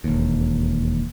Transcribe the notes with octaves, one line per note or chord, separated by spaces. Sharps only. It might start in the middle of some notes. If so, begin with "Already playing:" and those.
E1 D#2